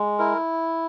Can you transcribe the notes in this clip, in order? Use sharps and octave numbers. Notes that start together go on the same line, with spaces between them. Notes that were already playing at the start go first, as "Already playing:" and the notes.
Already playing: G#3
E4 A#4